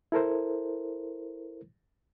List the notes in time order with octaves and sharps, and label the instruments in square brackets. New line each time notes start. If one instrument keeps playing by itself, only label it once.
[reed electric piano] E4 A4 A#4 C5